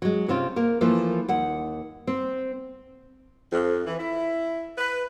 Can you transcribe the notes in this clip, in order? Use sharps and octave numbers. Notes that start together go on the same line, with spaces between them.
F#3 G#3
C3 C4 C#4 F4
A#3 A#4
E3 F3 A3 A#3
D#2 F#5
C4
F2
E3
E4
B4